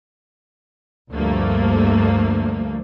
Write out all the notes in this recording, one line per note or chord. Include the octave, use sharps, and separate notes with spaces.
D2 G2 F3 A3 A#3